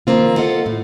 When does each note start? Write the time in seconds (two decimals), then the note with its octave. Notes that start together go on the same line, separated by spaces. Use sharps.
0.07 D#3 F3 A#3 C4 F4
0.37 F4 A4 D#5 F#5
0.66 A2